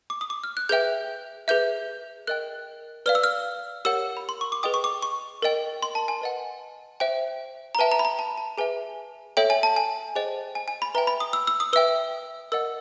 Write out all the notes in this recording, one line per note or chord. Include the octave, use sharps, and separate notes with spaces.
D6
D#6
D6
F6
F#6
G#4 B4 E5 G5 G6
G#4 B4 E5 G6
A#4 D#5 G5 F#6
B4 D5 F5 F6
E6
F6
G4 A#4 C#5 F#5 E6
B5
C6
C#6
D6
G#4 B4 D#5 G5 D#6
C#6
D6
C#6
A#4 D#5 G5
C6
A5
G#5
B4 D#5 F#5
C5 E5 G5
A#5
B4 E5 G5 A5
A#5
B5
A#5
A5
A5
G#4 B4 E5 G#5
A4 C#5 E5 G5
G#5
A5
G#5
G#4 C5 D#5 G5
G#5
G#5
B5
B4 E5 G5 A#5
B5
D#6
E6
E6
D#6
B4 E5 G5 E6
A#4 D#5 F#5 E6